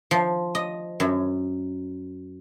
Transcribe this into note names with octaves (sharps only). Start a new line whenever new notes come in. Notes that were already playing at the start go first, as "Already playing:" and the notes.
F3
D#5
F#2